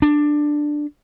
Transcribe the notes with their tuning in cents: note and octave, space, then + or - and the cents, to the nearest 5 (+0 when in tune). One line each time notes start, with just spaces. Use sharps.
D4 +10